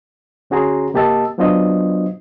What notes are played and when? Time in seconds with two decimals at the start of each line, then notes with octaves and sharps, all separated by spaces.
0.50 D2 C#4 F#4 G#4 A#5 C6
0.94 C3 A#3 G4 D#5 A5 E6
1.38 F#3 B3 D4 F4 C5 D#5